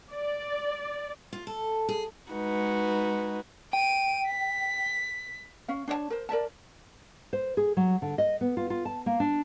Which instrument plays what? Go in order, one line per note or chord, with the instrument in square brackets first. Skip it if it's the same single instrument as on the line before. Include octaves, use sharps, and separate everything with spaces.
[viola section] D5
[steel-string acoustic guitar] F4
A4
G#4
[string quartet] G#3 D#4 F#4 B4
[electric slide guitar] G5 [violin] D7 D#7
[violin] B6
[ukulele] C#4 F5
D4 C#5 D5 A5
A#4 C5
A#4 D5 E5 A5
[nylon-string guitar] C5
G#4
F#3
D3
D#5
B3
F4
F4
A5
A#3
D4